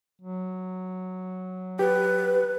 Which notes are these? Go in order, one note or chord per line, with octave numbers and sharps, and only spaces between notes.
F#3
G4 B4